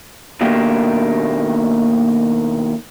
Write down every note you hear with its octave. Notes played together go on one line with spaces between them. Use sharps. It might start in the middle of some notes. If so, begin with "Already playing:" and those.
D#2 B2 A3 A#3 D4 G4